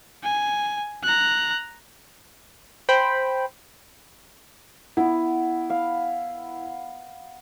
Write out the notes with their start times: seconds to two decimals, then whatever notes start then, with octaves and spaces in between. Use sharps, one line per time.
0.23 G#5
1.03 A#5 F#6
2.89 C5 G5 B5
4.97 B3 E4
5.70 F5